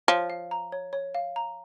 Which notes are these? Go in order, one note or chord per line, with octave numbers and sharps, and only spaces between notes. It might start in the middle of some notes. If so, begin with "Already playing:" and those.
F3 C#5
F5
A#5
C#5
C#5
F5
A#5